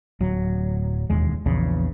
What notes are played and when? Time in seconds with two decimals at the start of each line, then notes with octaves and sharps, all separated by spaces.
0.20 D1 F#3
1.10 E1 D#2 G#3
1.46 A#1 E2 C#3